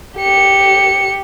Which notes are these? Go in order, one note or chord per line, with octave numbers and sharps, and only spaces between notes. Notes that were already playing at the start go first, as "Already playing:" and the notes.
G4 C#7